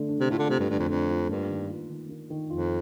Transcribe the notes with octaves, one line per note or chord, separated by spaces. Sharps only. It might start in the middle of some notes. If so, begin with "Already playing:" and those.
Already playing: D3 A3
D4
C3
A2 F4
D3
C3 A3
G2
G2 D3
F2
F2 D4
F4
G2 A#3
D#3
F4
D#3
A#3
D#3
F2 F4